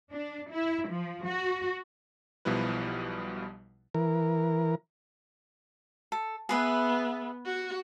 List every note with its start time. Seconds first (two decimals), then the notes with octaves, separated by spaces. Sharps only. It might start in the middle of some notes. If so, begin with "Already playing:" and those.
0.12 D4
0.52 E4
0.88 F3
1.26 F#4
2.45 B1 B2 F3 G3 E4 B4
3.95 E3 A#4
6.12 A4
6.49 B3 G#4 B4 E5
7.46 F#4